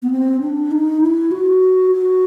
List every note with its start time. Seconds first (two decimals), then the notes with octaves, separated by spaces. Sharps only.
0.03 B3
0.11 C4
0.41 D4
0.71 D#4
1.01 E4
1.31 F#4
1.92 F#4